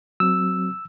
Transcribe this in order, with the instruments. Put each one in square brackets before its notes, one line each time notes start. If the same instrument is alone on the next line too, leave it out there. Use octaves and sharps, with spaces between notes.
[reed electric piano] F#3 C4 [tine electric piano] E6